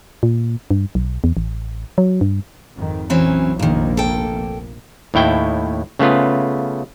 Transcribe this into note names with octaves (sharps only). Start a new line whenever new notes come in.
A#2
G2
B1
E2
A1
F#3
G2
G#1 F2 D#3
A#1 E3 F#3 C4 C#4
F1 A#1 D#2 D#3 A#3
A4 G5
D#2 A2 E4 G5
C#3 A3 B3 F4